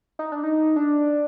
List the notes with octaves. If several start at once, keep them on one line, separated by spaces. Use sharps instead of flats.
D#4
D4
D#4
D4